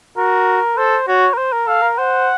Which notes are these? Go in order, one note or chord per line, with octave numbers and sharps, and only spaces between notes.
F#4 A#4
A4 C5
F#4 C#5
A#4
C5
A#4
A4 F5
A#4
C5 F#5